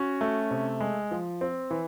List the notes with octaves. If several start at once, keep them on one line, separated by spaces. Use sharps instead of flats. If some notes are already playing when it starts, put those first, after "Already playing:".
Already playing: C#4 F#4
A3
C3
G#3
F3
C4
E3